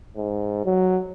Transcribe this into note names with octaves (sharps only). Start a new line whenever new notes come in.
G#2
F#3